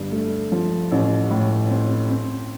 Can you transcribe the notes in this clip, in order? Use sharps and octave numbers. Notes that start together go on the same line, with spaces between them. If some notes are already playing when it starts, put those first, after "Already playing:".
Already playing: G1 G2
A3
F3
A1
A2
C4
C4